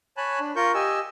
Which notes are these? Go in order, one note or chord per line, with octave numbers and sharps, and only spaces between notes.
C#5 G#5 A5 B5 F#6
D4
F4 A#4 C#6 G6
G4 D#5 G#5 E6